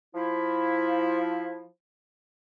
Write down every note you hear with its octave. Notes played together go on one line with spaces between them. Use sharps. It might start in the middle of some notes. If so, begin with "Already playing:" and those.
F3 E4